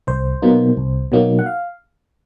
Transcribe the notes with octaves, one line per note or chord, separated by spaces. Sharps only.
C2 C5
B2 F#3 A#3 D#4
C2
B2 F#3 A#3 D#4
F#5
F5